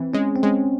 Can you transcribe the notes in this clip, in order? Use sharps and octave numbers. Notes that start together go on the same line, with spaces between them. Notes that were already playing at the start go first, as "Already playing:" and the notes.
Already playing: E3 C4
G#3 C#4
C4
G#3 C#4